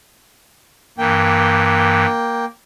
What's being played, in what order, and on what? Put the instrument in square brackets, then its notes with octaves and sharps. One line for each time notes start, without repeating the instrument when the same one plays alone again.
[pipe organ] G2 E3 [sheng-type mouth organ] A#3 G5